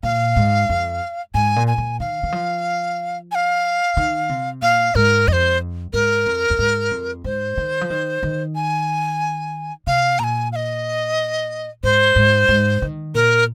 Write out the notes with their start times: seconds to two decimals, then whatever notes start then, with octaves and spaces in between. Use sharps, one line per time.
0.03 A#2 F5
0.36 G#2
0.69 F2
1.34 G#2 G#5
1.56 A#2
1.67 G#5
1.78 A#2
2.00 D#3 F5
2.23 D#3
2.32 F3
3.31 G#5
3.35 F5
3.97 D#3
4.29 C3
4.62 A#2 F5
4.95 G#2 A#4
5.27 F2 D#5
5.33 C5
5.93 G#2 A#4
6.26 F2
6.50 F2
6.59 G#2
6.91 F2
7.24 G#2 C5
7.57 D#3
7.81 F3
7.90 D#3
8.23 D#3
8.55 G#5
9.87 C3 F5
10.19 A#2 A#5
10.24 G#5
10.52 F5
10.56 D#5
11.84 G#2 C5
12.16 G#2
12.49 G#2
12.82 D#3
13.14 A#2 A#4